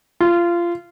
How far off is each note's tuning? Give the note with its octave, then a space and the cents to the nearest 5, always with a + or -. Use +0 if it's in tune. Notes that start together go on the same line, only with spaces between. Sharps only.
F4 -20